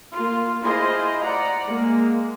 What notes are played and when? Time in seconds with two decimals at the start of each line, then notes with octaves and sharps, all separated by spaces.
0.11 A#3 F4
0.61 E4 F4 G#4 C5 D#5
1.22 D5 F#5 A#5
1.66 G#3 A#3